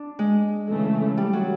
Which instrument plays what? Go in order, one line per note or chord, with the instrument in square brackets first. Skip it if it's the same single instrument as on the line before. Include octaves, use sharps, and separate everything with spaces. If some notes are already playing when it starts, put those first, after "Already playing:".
Already playing: [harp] D4
G#3
[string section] C#3 E3 A3
[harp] G3
F#3